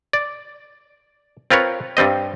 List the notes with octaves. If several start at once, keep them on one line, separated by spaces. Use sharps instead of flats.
D5
C4 F4 A#4 B4 C#5
G2 G3 C4 D#5